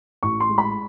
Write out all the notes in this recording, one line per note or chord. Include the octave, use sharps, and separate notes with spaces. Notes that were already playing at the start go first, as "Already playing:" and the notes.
A1 C#6
C6
G#3
B5